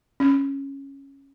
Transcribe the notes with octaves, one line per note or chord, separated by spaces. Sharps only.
C#4